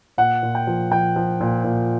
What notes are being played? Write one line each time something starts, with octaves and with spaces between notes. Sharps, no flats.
A#2 F#5
A#2
G5
F3
F3 G5
F3
A#2
A#2